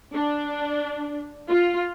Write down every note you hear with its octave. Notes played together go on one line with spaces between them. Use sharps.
D4
F4